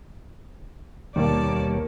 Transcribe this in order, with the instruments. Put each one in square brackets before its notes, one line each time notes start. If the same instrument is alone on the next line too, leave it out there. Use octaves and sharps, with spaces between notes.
[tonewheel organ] D#2 B2 C#5 [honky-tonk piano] D#3 A#3 [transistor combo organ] G3 [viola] D5 A5